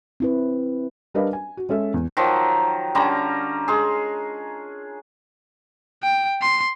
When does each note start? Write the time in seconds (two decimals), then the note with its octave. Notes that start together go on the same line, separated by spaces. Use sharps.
0.20 C4 E4 B4
1.14 G3 D4 A#4 B4 D#5 F5
1.33 G#5
1.57 F#4
1.69 G#3 C#4 A4 E5
1.94 E2
2.17 D#3 F3 F#3
2.95 D3 G3 C#4 A#5
3.68 G#3 G#4
6.03 G5
6.42 C6